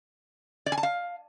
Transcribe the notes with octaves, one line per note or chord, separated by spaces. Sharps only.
D5
G#5
A5
F5